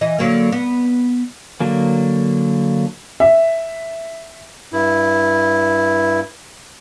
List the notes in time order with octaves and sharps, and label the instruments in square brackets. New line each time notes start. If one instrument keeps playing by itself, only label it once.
[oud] E3 D#5
D3 F#3 A#3
B3
[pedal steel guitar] D3 F#3 A#3
[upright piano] E5
[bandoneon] G2 E4